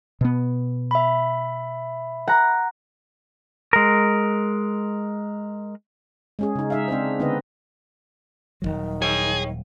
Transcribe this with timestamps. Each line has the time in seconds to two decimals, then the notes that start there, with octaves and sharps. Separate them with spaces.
0.21 B2 B3
0.91 E5 B5
2.28 F#5 A#5
3.73 G#3 A#4
6.39 G#3 C#4 G#4
6.55 C#3 D#4
6.70 D#4 E5 F5
6.88 C4 D4 D#4 C5
7.19 D3 B3 D#4 B4 D#5
8.62 D#1 B1 D#3 F#3
9.02 G#4 C#5 G5